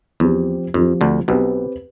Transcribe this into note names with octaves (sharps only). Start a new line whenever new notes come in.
E2 F3 C4 G4
F2 F3 C4 G4
D2 D3
B1 B2 C4 G4 B4